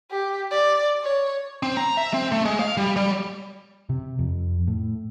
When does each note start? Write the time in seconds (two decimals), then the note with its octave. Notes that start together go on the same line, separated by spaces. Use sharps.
0.11 G4
0.51 D5
1.03 C#5
1.63 C4
1.77 A#5
1.97 E5
2.14 C4
2.32 A3
2.45 G#3
2.60 F5
2.77 G3
2.96 G3
3.89 C3
4.19 F2
4.67 A2